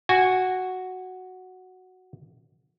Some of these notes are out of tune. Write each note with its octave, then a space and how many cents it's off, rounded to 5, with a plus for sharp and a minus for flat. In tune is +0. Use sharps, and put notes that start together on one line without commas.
F#4 +0 G#5 -20